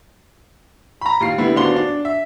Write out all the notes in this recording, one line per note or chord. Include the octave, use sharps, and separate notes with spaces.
A#5 B5
D#2 F4 C7
D3 G3 B3 E4
D#1 B3 D4 F#4 C6 G7
D4
E5